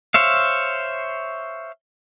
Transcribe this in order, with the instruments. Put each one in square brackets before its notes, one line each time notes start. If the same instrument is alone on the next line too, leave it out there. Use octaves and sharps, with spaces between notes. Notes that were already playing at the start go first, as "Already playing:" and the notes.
[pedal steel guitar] C5 C#5 E5 F5